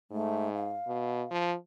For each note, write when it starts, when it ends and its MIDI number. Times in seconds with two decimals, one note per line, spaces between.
0.11 0.76 44
0.11 0.52 57
0.54 1.35 77
0.87 1.23 47
1.31 1.55 53